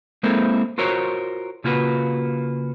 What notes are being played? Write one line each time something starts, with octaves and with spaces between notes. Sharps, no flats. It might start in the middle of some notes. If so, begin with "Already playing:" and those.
G#3 A#3 C4 E4 A4 A#4
F4 F#4 A#4 C5 C#5
C#3 A#3 F4 F#4 B4